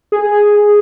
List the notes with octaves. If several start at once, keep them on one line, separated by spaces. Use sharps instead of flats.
G#4